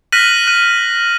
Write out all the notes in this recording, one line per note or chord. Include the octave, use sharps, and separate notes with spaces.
F6 F#6 A#6 B6 D#7 F#7
F#6 D#7